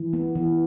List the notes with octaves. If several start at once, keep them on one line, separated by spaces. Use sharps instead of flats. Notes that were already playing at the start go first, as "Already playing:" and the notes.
Already playing: E3
B3
E3